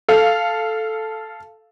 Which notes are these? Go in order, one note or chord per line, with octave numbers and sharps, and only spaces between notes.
A4 F5